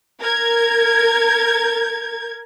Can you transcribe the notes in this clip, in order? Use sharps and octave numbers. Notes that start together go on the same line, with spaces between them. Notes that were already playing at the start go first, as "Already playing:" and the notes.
A#4 G#6